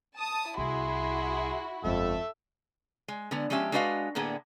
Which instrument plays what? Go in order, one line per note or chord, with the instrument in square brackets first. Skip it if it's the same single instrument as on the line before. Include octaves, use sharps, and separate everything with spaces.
[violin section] A5 D#6
[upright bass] C2 [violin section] E4 F#4 [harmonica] G#4 C6
[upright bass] G1 G#3 [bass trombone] F2 [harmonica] A4 E5
[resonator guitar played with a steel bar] G#3
D3 G#3 B3
F3 G#3 C#4 G4 E5
G#3 D4 F#4 B4 D#5 F5
A2 D3 A#3 B3 G#4